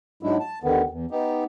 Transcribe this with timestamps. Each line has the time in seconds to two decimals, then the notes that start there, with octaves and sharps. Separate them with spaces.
0.23 G#2 F#3 G#3 D4 E4
0.40 A5
0.63 D#2 D3 D#3 B3
0.90 E2
1.11 B3 D#4 G4